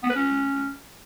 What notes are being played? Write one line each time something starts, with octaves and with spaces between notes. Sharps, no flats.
B3
B4
C#4